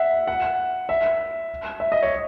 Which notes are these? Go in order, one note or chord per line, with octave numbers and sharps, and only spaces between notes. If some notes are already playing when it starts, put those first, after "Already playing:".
Already playing: E5 F#5
F#5
E5
E5
D#5
C#5